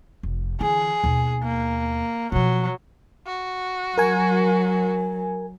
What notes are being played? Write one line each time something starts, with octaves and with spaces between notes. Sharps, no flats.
F1
D3 E3 G#4
D#2 B2
A#3
B2 F3 F#3
F#4
F#3 A#4 G#5